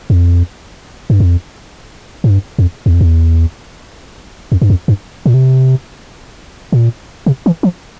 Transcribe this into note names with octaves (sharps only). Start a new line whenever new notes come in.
F2
G2
F2
G#2
G2
F2
E2
F2
E2
F2
G2
F2
G2
A#2
C3
A#2
C3
E3
F3